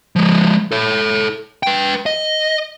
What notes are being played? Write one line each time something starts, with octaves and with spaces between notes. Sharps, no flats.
F3 G#3
A4 C#5
B4 G5
D#5